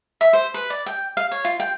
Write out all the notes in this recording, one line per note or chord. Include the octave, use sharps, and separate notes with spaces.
E5
C5
B4
D5
G5
F5
C#5
F4
G5